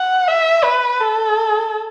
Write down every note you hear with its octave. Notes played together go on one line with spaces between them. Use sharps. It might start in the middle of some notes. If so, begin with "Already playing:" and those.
Already playing: F#5
E5
B4
A4